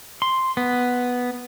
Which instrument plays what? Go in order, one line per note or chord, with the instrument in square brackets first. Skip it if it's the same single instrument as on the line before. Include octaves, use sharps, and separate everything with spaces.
[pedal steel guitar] C6
B3